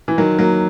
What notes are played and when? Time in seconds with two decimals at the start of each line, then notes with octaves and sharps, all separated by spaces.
0.08 E3
0.18 D#3 F#3
0.39 F#3 A#3